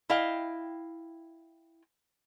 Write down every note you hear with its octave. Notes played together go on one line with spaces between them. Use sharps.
E4 D#5 F5 G5